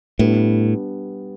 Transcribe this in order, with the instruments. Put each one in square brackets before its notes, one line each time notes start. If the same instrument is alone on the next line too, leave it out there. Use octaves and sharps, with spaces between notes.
[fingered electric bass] A2 [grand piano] G3 B3 D4